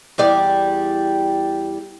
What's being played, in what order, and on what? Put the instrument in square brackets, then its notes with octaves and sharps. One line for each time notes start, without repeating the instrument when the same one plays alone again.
[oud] E2 G3 D5